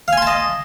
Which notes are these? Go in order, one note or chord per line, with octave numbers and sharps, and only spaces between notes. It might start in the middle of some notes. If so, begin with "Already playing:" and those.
D#5 F5 G#5 A5 C6